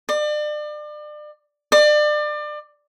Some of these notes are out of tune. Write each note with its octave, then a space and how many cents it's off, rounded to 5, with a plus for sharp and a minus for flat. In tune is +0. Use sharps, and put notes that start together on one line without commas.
D5 +35
D5 +30